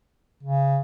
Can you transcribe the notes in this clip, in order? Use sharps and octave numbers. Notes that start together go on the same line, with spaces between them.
C#3